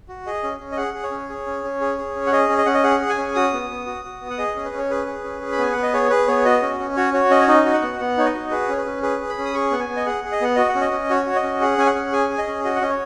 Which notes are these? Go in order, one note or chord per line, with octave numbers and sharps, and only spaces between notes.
F#4
G#4 D#5
C#4
C#4
D#5
G#4 F#5
G#4
C#5
C#4
G#4
C#4
C#4
G#4
G#4
C#4
F#5
G#4 D#5
C#4
D#5
C#4 F#5
D#5
G#4 F#5
G#4
G#5
C#4
F#4 D#6
B3
B3
F#4
F#4
B3
F#5
G#4 D#5
C#4
B4
C#4
C#5
G#4 B4
G#4
C#4
G#4
B5
B3 G#5
B3 F#5
D#5
G#4 C#5
G#4 B4
B3 C#5
F#4 D#5
C#4
C#4
F#4 C#5
F#4 C#5
C#4 D#5
C#5
D#4 D#5
F#4
F#5
B3
B3 F#5
D#4 C#5
D#5
F#4
G#4 B4
C#4 C#5
B4
C#4
G#4 B4
G#4
B5
C#4
D#6
G#4 C#6
B3 F#5
G#5
B3
D#5
G#4 F#5
G#4
D#5
B3 F#5
F#4 D#5
F#5
C#4
D#5
C#4
F#4 C#5
F#4
D#5
C#4
G#4 F#5
C#4 G#5
F#5
C#4
G#4 G#5
G#4
D#5
C#4
F#4 D#5
F#5
C#4 D#5
C#5